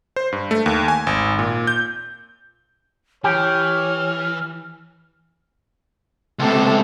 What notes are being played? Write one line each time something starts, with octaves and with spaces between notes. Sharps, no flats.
C5
G2
A3
D#2
G#5
G#1
A#2
G6
E3 G4 C#5 F6
C#2 C3 A3 A4